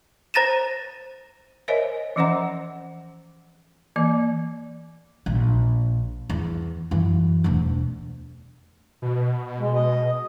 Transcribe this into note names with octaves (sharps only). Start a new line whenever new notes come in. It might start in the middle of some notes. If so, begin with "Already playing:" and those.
C5 A#5 A6 A#6 D#7 E7
A#4 C5 C#5 D#5 E5 G#5
E3 F3 C#4 C5 F#5 A#5
E3 A#3 D5
A#1
E2
F#2 E3
E1 D2
B2
G#3
D#5